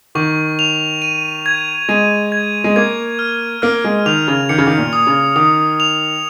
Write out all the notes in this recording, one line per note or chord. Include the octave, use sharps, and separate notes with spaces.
D#3 C#6
F7
D#7
G#6
G#3 D#7
G#6
G#3
A#3 G#6
F6
A#3 F6
G#3
D#3 F7
C#3
D#3 C#7
C#3
D#3
A#2
D#6
C#3
D#3 D#6
F7